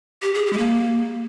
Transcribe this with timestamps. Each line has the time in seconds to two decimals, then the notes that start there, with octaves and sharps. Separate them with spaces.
0.22 G4
0.34 G#4
0.46 G4
0.53 G#3
0.58 A#3